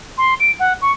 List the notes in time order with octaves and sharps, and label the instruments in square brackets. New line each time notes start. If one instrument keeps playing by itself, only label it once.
[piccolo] C6
D7
F#5
C#6